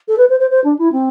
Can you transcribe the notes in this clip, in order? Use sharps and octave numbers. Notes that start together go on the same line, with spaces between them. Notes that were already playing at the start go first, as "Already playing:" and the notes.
A4
B4
C5
C5
C5
D4
E4
C4